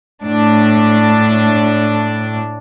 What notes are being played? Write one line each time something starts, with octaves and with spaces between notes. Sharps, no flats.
A2 D4